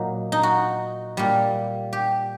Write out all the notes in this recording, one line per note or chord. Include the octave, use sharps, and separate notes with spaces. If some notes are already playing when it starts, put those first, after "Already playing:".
Already playing: A#2 F#3 D#4
D#4
F#4
A#2 G3
G4